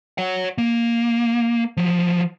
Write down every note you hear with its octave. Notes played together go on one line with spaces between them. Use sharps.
C#5 F#5
A#3
F3 F#3